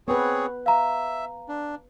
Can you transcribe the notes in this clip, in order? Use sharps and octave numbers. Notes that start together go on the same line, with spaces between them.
B3 C4 G#4 B4 C#5
E5 F5 A#5
D4